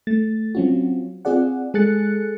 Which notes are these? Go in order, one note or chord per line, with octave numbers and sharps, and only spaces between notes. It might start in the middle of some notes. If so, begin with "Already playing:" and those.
A3 A6
F#3 C4 C#4 F4 F#4
C4 F4 G#4 D5 F#5
G#3 G#4 A4 F#6 A6 C#7